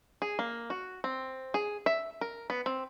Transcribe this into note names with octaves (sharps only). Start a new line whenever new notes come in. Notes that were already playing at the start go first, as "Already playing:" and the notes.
G#4
A#3
F#4
C4
G#4
E5
A#4
B3
C4